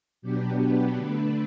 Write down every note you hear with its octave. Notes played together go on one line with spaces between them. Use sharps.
B2 F#3 B3 D4 G4
B4
D3 A3 D4